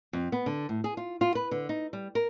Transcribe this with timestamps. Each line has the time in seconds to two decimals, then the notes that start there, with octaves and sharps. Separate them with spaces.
0.13 F2
0.32 B3
0.46 D3
0.69 A2
0.84 G#4
0.97 F4
1.21 F4
1.35 B4
1.51 D3
1.69 D#4
1.93 G3
2.15 A#4